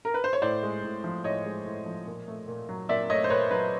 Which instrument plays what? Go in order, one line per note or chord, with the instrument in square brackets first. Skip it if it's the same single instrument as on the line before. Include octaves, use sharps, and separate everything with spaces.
[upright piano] A#4
B4
C5
C#5
A2 C5 D5
G#3
A2
F3
A2 C#5 D#5
G#3
A2
F3
A#2
A3
A#2
F#3
A#2 D5 E5
A3 C#5 D#5
C5
A#2 B4 C#5
F#3 B4